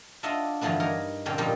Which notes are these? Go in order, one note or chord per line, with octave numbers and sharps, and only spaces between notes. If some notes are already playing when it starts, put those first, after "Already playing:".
D4 F4 D#5 E5 F#5
G2 D3 E3 F3 B3 D4
D#4 A#4 C#5
A#2 D3 C4 C#4 G4
A#2 F3 G3 D#4 G4